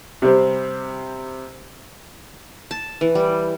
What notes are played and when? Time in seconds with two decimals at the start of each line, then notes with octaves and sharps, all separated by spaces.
0.22 C3 G3 C4
2.71 A5
3.01 E3
3.15 G3